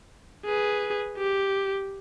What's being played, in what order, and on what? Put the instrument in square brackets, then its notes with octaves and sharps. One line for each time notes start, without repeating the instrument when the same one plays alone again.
[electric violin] G#4 B4
G4